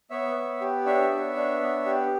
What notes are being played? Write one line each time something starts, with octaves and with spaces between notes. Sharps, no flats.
B3 C#5 E5
B3
G4
D4 C#5 E5
B3
D4
B3
G4